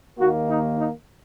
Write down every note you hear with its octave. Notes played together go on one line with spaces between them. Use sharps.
D#2 D#3 A#3 F#4
D#4
D#4